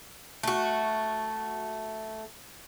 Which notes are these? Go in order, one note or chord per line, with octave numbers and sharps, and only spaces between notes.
A3 F#4